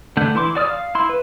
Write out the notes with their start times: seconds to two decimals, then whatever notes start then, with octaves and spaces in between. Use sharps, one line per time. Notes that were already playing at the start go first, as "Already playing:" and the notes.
0.17 D3 A3 F#5 G6
0.35 E3 E4 C6 D6
0.55 F#4 D5 D#6 F6
0.69 F5
0.95 E4 C6
1.09 B4